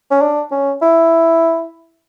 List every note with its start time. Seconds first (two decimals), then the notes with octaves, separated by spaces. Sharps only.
0.11 C#4
0.21 D4
0.51 C#4
0.82 E4